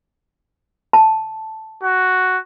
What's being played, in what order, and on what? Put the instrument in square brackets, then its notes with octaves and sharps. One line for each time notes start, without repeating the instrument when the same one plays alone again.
[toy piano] A5
[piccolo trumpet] F#4